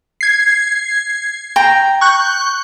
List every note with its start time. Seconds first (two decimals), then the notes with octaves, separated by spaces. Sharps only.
0.21 G#6 C7
1.56 G5 A#5
2.01 C#6 F#6 G6